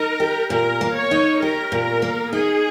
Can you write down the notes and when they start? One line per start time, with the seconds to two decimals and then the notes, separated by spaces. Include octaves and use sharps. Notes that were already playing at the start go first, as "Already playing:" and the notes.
Already playing: D#4 A#4
0.20 G4
0.50 A#2 A#4
0.81 A#3
0.96 C#5
1.11 D#4
1.42 G4 A#4
1.72 A#2
2.02 A#3
2.32 D#4 G#4